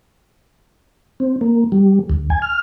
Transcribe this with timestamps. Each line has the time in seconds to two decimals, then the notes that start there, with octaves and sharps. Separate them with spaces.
1.20 C4
1.41 A#3
1.72 G3
2.10 D2
2.30 G#5
2.42 F6